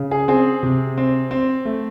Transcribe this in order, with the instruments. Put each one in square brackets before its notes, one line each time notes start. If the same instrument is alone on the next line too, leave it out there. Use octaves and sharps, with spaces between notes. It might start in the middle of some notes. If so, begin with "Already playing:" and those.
Already playing: [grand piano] C#3
G#4
C4 G#4
C3
C4
C4
A3